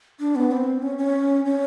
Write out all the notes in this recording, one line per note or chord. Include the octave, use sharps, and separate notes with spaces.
D4
B3
C4
C#4
C#4
C#4